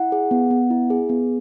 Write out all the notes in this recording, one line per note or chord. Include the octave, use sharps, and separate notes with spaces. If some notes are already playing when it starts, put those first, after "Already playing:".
Already playing: E4 F#5
G#4
B3
B3
E4
G#4
B3